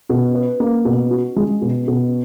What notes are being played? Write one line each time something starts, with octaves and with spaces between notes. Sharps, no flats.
B2
B4
A#3
B2
F#4
G#3
B2
B2